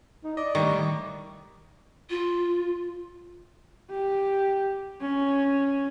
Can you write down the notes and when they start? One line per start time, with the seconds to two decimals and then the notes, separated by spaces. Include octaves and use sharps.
0.24 D#4
0.37 D5 D#5
0.55 A2 D#3 G3 C#6
2.09 F4
3.90 G4
5.01 C#4